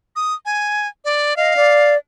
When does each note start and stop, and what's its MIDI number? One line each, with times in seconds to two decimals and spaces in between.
0.16 0.34 87
0.45 0.88 80
1.05 1.36 74
1.37 1.54 75
1.37 1.94 77
1.56 1.97 74